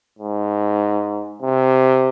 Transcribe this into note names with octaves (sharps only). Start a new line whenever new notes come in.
G#2
C3